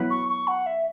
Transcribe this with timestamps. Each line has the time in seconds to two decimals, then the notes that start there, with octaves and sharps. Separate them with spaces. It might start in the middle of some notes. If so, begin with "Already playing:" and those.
Already playing: F#3 B3 E4 B4
0.10 C#6
0.28 C#6
0.47 F#5
0.66 E5